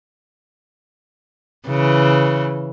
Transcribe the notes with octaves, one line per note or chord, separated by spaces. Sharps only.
C#3 E3